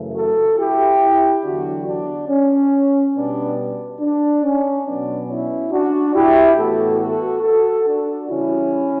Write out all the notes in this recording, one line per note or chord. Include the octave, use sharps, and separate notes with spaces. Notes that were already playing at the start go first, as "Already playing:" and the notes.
Already playing: F#2 C#3 E3 A3
F#4 A4
E4 G4
E2 D3 F#3 D4 F#4
D4
C#4
B2 G3 B3 D4
D4
C#4
B2 F#3 B3 D4
C#4 E4
D4 F#4
E4 G4
A2 E3 B3 F#4 A4
F#4 A4
F#4 A4
D4 F#4
C#3 E3 G3 C#4 E4